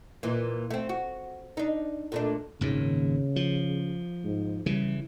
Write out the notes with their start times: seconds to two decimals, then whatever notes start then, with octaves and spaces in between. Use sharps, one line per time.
0.23 A#2 E3
0.71 A3 C4
0.89 F#4
1.57 D4 D#4
2.12 A#2 A3 D4
2.61 G#1 D#2 A#2 C#3
3.36 F3
4.24 G#2
4.66 C#3 E3 G3